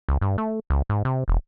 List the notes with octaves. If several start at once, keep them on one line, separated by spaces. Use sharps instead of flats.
C#2
G2
A3
C#2
G#2
C3
E1